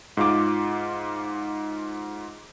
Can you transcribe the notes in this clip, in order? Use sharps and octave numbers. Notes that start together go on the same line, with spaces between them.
G#2 F4 D6